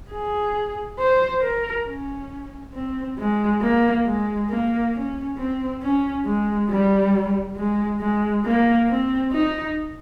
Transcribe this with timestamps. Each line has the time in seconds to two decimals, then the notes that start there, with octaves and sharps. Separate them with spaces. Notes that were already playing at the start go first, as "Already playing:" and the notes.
0.11 G#4
0.99 C5
1.42 A#4
1.86 C#4
2.74 C4
3.18 G#3
3.62 A#3
4.06 G#3
4.50 A#3
4.94 C#4
5.38 C4
5.82 C#4
6.26 G#3
6.69 G3
7.56 G#3
8.01 G#3
8.45 A#3
8.89 C4
9.32 D#4